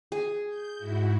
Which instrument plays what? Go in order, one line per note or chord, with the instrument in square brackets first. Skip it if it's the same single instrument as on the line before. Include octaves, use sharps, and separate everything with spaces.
[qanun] G#4
[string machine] G6
G#2 E4 F#4